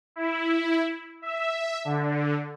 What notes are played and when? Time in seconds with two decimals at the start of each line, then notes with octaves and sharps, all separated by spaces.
0.16 E4
1.22 E5
1.85 D3